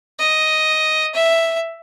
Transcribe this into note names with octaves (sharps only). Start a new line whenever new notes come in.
D#5
E5